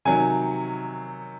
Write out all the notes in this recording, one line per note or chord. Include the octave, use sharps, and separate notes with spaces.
C3 D#3 F#3 G#5